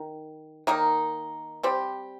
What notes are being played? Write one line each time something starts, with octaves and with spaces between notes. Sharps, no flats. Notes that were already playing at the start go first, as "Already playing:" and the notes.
Already playing: D#3
D#3 A#3 D#4
G3 C4 G4